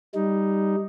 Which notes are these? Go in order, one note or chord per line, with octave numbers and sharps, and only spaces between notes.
G3 D#4